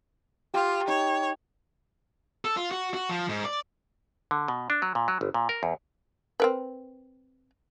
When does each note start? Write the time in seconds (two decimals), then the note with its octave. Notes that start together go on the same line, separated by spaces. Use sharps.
0.54 F4 G4
0.88 D#4 C#5
2.45 A4
2.57 F4
2.71 F#4
2.94 F#4
3.09 F3
3.29 G#2
3.45 D5
4.31 D3
4.48 B2
4.70 D4
4.82 F#3
4.95 A#2
5.08 F#3
5.21 G1
5.34 A#2
5.49 A#4
5.63 E2
6.40 C4 A#4 B4